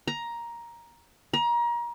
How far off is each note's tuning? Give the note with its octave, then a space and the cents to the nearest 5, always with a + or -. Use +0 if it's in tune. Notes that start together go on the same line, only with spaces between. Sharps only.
A#5 +10
A#5 +30